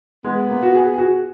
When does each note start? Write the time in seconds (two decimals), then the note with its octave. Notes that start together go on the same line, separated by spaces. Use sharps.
0.24 G#3 B3
0.49 A#3
0.63 F#4
0.75 G#4
0.94 G#4
0.98 F#4